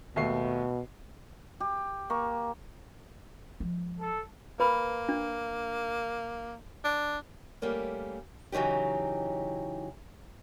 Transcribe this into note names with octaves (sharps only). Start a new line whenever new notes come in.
D#2 B2 A3 C7
G4
A#3 C#6
F3 G#3
A4
A#3 B4 B5
D4
D4
G3 A3 A#3 C#4
C#3 E3 F#3 D#4 G4